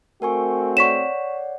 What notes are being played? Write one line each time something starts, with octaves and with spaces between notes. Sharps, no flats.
A3 C4 F#4 A#4 G#5 C#6
C#5 D5 F#5 C#6 B6 E7